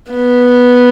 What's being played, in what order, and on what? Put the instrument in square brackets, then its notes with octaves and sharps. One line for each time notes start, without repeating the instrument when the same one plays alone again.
[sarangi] B3